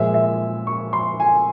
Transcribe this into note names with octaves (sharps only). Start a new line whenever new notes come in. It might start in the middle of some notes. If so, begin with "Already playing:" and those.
Already playing: A#2 F3 G#3 E5
E5
C#6
C6
G#5